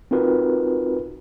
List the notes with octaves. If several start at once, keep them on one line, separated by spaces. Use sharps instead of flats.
C4 D#4 F4 F#4 A#4 B4